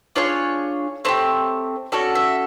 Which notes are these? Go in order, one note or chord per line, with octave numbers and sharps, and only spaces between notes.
D4 F4 G#4 C#5
A3 C4 D#4 G4
C#4 F#4 A4 D5
E5